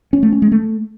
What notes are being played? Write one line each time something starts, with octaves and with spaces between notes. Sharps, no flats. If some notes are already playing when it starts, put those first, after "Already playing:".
C#4
A3
C#4
G#3
A3